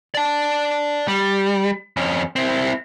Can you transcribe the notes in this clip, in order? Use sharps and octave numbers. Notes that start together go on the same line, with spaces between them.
D5 A5
G3
F2 C#4
C4 E4